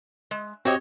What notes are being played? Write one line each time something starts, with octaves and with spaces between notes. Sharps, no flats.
G#3
C4 F#4 G4 C#5 D#5